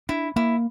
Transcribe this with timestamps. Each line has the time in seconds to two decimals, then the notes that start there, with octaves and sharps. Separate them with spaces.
0.09 D4 E4
0.36 A#3 E4